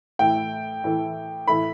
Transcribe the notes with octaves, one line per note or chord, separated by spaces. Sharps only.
A2 E3 A3 E4 A4 G5
A2 E3 A3 E4 A4
A2 E3 A3 E4 A4 B5